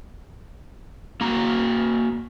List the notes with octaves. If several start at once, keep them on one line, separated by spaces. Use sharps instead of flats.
A#3 F#4 A#5